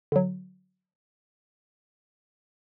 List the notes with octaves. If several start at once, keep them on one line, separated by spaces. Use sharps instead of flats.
D3 F#3